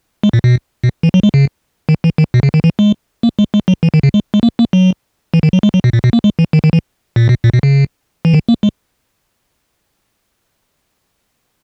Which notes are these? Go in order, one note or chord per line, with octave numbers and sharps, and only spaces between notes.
G#3
A#2
B2
B2
E3
F#3
G#3
C#3
D#3
E3
D#3
B2
C#3
D#3
E3
G#3
A#3
G#3
G#3
F#3
E3
D#3
C#3
G#3
G#3
A#3
A#3
F#3
E3
D#3
F#3
G#3
F#3
B2
A#2
B2
A#3
G#3
E3
D#3
D#3
E3
A#2
B2
A#2
B2
C#3
E3
D#3
A#3
G#3